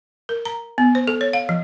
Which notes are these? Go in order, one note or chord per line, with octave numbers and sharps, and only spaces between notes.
A#4
A#5
B3
C5
A4
C#5
F5
F3